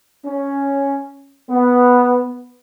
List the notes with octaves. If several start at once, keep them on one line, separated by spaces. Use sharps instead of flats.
C#4
B3